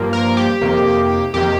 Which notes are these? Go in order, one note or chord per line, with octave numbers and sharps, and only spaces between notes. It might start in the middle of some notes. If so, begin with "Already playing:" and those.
Already playing: G2 F3 A#3
A#4
G4
F2 C3 D#3 A#3
F2 C3 D#3 A#3 G4